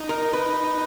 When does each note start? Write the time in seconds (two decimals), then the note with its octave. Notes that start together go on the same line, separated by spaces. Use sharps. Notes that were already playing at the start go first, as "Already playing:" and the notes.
Already playing: D#4
0.09 A#4
0.33 B4